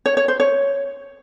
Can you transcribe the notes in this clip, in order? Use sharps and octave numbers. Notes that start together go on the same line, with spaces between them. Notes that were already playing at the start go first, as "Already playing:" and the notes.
C#5
C#5
C5
C#5